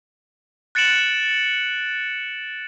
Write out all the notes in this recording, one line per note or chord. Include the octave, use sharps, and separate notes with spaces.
F#6 A6 C#7 D7 E7 F#7